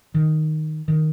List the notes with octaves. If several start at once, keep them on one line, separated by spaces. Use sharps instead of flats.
D#3
D#3